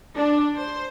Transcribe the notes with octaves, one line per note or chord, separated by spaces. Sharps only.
D4
C5